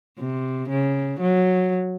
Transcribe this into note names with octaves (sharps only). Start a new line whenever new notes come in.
C3
C#3
F#3